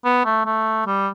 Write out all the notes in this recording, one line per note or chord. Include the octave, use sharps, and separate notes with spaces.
B3
A3
A3
G3